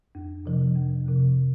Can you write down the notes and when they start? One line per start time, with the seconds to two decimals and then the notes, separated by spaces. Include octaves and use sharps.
0.15 F2
0.46 C3 F3
0.76 F2
1.06 C3 F3